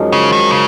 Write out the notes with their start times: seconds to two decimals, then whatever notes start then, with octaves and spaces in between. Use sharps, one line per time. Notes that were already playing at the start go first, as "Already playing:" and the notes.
Already playing: F#2 F3 G#3 D#4
0.12 C#3
0.32 D#3
0.52 C#3